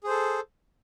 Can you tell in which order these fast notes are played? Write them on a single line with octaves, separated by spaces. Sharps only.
G#4 C5 A4